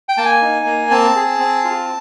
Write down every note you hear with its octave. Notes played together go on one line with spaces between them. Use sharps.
G5
A#3 A5
G#5
D#4
A#3
C4 A5
G#4
C4
F4